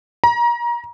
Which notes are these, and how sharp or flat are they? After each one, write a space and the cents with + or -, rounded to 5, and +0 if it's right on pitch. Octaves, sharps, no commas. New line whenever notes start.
A#5 +30